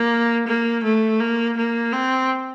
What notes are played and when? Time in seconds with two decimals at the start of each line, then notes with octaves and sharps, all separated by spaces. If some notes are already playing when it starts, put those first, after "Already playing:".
Already playing: A#3
0.47 A#3
0.84 A3
1.20 A#3
1.57 A#3
1.93 C4